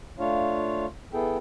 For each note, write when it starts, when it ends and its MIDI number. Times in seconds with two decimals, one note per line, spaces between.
0.19 0.86 57
0.19 0.86 62
0.19 0.86 65
0.19 0.86 73
0.19 0.86 77
1.13 1.37 59
1.13 1.37 64
1.13 1.37 68
1.13 1.37 69
1.13 1.37 79